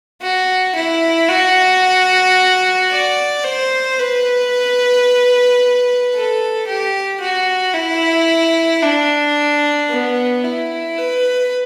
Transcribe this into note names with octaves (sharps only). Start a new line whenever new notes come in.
F#4
E4
F#4
D5
C5
B4
A4
G4
F#4
E4
D4
B3
E4
B4